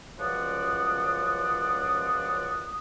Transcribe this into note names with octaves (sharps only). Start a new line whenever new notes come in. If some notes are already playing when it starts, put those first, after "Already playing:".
C#2 F#2 F3 D5 F#5 D#6